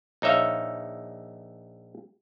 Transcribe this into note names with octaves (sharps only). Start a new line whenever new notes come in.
A#1 D#4 C#5 E5 F5